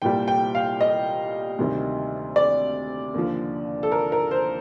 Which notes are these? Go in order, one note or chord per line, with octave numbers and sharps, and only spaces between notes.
C2 A#2 G3 G5
G5
F5
D#5
D2 C3 D#3 G3
D5
D#2 D3 F3
A4
A#4
A#4
C5